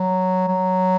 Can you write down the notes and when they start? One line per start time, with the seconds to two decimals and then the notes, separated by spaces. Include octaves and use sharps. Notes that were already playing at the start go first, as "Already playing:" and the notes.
Already playing: F#3
0.48 F#3